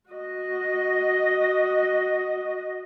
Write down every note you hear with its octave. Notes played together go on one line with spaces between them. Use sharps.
F#4 D#5